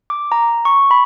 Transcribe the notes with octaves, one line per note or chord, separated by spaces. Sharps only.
D6
A#5
C#6
B5